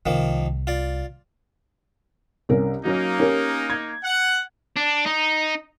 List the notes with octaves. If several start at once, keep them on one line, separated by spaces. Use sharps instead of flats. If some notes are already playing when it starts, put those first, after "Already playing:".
C2 D#3 F3 A#3
F4 D5
C2 C#4 A#4
F#3 A#3 C#4 D#4
C#4 G4 A#4
G#6
F#5
D4
D#4